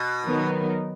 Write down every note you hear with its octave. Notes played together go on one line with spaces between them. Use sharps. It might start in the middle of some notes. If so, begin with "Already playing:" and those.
Already playing: B2
D#3 F#3 B3 D#4 A#4